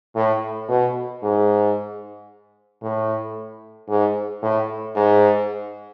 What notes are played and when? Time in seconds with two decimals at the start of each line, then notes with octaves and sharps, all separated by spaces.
0.16 A2
0.69 B2
1.23 G#2
2.82 A2
3.89 G#2
4.42 A2
4.96 G#2